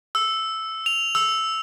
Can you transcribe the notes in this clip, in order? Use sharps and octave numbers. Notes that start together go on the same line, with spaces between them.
E6
F7
E6